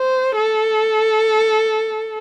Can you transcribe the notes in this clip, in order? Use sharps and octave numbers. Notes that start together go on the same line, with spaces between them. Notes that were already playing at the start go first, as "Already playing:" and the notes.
Already playing: C5
A4